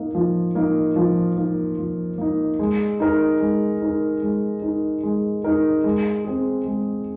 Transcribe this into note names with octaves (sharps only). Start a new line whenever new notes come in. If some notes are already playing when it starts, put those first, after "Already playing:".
Already playing: A#3 D#4
F3
A#3 D#4
F3
A#3 D#4
F3
A#3 D#4
G#3
D#4 A#4
G#3
D#4 A#4
G#3
D#4 A#4
G#3
D#4 A#4
G#3
C4 G#4
G#3